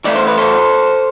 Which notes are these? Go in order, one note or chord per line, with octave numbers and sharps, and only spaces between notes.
E3 A3 E4 D5
C5
B4
A4 C5